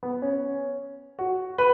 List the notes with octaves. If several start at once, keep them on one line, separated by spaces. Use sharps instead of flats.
B3
C#4
F#4
B4